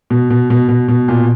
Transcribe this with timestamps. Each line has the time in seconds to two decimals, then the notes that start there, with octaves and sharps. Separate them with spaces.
0.10 B2
0.30 B2
0.50 B2
0.68 B2
0.88 B2
1.08 A#2